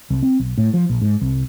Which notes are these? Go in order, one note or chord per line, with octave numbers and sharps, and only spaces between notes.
C2
C4
B1
A2
F3
A#1
G#2
C2